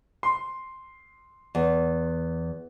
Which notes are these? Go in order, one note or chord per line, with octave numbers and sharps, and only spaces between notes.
C6
E2